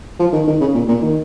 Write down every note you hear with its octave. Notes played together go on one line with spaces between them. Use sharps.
F3
D#3
D#3
C#3
A#2
A#2
D#3